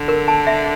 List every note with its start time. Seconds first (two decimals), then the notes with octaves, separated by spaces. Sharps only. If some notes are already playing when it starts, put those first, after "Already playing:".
Already playing: D3
0.08 A#4
0.28 A5
0.47 E5